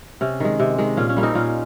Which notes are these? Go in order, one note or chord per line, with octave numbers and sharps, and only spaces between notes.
C3 C#4
D#3 G#3
C3
D#3 G#3
A#2 C#4 F4
C#4
G3 A#3
C4 D#4
A#2 C#4 F4